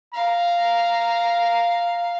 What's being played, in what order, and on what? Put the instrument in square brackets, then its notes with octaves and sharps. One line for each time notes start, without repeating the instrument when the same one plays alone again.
[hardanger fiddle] F5 [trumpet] A#5